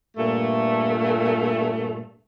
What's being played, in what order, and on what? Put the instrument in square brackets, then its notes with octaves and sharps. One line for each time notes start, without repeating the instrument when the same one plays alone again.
[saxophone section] G2 A#2 A3